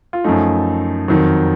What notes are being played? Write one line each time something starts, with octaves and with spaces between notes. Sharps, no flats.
F4
F#2 F3 A3 D#4
F2 D#3 F#3